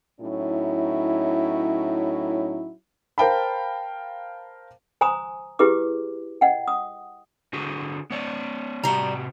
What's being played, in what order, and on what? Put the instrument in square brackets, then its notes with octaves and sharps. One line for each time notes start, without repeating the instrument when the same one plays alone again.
[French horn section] A2 F#3 C#4 D#4 E4
[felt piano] A#4 C5 F5 G5 A5 B5
[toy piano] C5 G#5 A#5 C6 D#6
E4 G4 G#4 B4 D6
D#5 F#5 G5
D#6
[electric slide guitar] D3 F#4 G#4
B3 C#5 D5
[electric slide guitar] C3 F#4 [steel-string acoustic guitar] G3 A#5